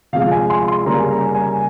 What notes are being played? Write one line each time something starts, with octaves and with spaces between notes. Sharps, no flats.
C3 F3 G#3 F5
G#5
C6
C6
C#3 G3 A#3 A#5
G#5
A#5
G#5